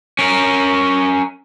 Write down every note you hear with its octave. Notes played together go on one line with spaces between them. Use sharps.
C#4 A#4